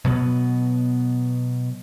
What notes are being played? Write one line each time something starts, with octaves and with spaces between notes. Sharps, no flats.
B2 F#3 B3